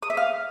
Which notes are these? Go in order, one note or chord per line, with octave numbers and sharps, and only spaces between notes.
D#6
E5
F5